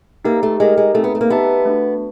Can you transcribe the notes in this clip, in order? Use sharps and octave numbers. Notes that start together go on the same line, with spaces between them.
A#3 D#4 G4 B4 E5
A3
G#3 D#4 G4 A#4 D#5
G#3
A3 C4 D#4 G#4
B3
A3
A#3
B3 D#4 G4 B4 E5 A5
A3 D4 F#4